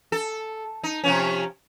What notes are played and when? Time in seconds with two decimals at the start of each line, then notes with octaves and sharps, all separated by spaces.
0.12 A4
0.84 D#4
1.04 C3 F3 C#4